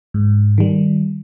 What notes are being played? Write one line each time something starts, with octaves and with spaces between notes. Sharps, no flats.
G#2
D#3 G3